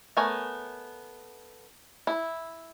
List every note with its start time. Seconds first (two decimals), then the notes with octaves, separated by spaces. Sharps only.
0.17 A3 B3 A#4 C#5 G#5
2.07 E4